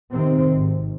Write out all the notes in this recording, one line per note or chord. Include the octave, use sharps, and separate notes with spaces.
C3 D#3 C4
G#1